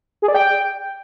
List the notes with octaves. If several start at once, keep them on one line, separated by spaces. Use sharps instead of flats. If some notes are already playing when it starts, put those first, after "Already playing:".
G#4
D5
G5